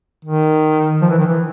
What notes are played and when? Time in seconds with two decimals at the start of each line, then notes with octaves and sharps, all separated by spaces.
0.25 D#3
1.01 F3
1.10 E3
1.18 D#3
1.27 E3